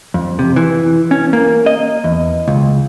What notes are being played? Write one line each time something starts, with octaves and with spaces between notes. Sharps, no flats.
F2
C3
E3
C#4
A#3
D#5
E2
C#2